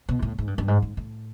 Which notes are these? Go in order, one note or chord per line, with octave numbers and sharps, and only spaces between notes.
B2
G#2
A2
G#2
G2
G2
G#2
G#2
A2